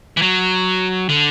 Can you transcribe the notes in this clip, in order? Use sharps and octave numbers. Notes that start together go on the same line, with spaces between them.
E3
F#3
D3